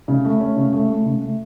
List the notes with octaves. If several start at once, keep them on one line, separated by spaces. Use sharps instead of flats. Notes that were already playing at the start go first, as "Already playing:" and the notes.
C#3
A3
C#4
C#3
A3
A3
C#3
A3